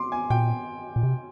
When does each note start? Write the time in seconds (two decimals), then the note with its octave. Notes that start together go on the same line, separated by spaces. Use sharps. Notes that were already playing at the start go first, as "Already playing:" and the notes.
Already playing: C6 D6
0.12 G#5
0.30 A#2 G5
0.96 A#2
1.03 C3